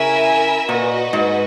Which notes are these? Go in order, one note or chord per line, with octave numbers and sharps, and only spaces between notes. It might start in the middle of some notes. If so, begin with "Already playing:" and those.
Already playing: C#3 E4 A#4 E5 G#5
A#2 F#4 B4 D#5
G#2